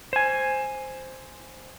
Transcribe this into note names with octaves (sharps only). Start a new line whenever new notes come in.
C5 G#5